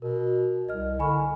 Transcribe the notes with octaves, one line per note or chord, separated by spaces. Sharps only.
B2 A#4
C2 D#5 F6
D3 G#5 B5 C#6